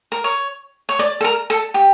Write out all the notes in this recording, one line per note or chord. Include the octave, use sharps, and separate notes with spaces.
A#4
C#5
C#5
D5
A4
A#4
A4
G4